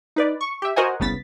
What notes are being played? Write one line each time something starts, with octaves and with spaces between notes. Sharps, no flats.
D#4 B4 D5
C#6
G4 E5
F#4 A#4 C5 D#5 F#5 G#5
G1 C2 C#3 B3 A6 B6